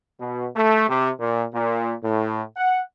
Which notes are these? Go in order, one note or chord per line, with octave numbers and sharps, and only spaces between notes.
B2
A3
C3
A#2
A#2
A2
F#5